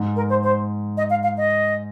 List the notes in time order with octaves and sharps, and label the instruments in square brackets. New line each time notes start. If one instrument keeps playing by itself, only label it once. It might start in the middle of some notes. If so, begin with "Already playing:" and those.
Already playing: [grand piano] G#2
[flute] A#4
C5
C5
D#5
F5
F5
D#5